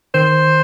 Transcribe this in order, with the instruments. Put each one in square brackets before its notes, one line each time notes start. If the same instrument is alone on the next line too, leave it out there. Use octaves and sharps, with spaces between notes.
[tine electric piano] D#3 [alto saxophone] C5